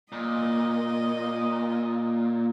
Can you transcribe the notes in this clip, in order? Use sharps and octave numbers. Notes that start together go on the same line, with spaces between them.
A#2 D#5